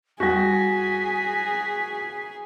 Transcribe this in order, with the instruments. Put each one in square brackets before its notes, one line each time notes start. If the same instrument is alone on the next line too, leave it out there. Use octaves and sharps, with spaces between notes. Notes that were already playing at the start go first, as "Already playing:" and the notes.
[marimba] E2 G3 [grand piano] F#4 [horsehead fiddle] G#4 [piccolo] B6